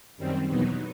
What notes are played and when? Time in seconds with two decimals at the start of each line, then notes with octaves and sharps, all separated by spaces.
0.17 F#2 D#3 G3 C4
0.48 E2 B2 F#3 B3 D#4